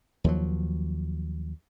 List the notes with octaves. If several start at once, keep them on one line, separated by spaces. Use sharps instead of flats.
D#2 F3 F#3